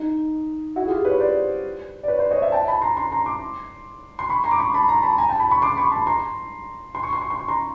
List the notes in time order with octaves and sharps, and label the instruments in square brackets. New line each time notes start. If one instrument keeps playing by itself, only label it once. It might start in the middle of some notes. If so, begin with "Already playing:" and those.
Already playing: [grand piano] D#4
E4 F#4
G#4
F4 G4
B4 C#5
C5 D5
D5
B4 C#5
C5 D5
C#5 D#5
D5 E5
G5 A5
A5 B5
A#5 C6
A#5 C6
A#5 C6
C6 D6
C6
B5 C#6
A#5 C6
D6
B5 C#6
A5 B5
A#5 C6
A5 B5
G#5 A#5
G5 A5
A5 B5
B5 C#6
C6 D6
B5 C#6
A5 B5
A#5 C6
C6
C#6
C6
C#6
C6
C#6
A#5 C6